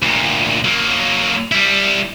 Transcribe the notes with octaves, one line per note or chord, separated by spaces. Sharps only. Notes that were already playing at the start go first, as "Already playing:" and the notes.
D2 A#2
F#3 A#3
G3 E4